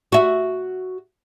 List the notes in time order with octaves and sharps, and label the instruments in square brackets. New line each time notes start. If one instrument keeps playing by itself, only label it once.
[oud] F#4 E5